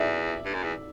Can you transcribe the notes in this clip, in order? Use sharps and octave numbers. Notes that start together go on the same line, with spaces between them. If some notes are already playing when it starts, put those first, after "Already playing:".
Already playing: E2 D5 E5
G2
F#2
E2